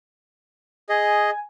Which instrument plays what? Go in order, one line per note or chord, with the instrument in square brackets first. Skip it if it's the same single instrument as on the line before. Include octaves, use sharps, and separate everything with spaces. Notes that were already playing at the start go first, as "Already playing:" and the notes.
[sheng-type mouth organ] G#4 D#5 [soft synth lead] G#5